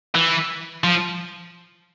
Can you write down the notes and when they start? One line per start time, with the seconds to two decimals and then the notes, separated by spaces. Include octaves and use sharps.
0.15 E3
0.84 F3